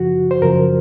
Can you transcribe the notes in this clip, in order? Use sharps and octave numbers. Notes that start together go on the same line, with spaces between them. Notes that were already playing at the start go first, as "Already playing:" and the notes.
Already playing: F#2 C#3 F3 F#4
C5
F#2 C#3 F3 A#4